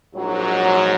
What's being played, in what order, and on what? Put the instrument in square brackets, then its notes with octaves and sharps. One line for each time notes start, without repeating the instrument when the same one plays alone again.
[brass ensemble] A#1 G#2 F#3